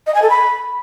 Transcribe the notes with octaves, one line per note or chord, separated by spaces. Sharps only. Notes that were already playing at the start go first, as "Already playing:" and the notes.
D#5
G#5
A4
B5